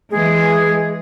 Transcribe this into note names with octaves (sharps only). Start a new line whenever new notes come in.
E3 G#3 G#4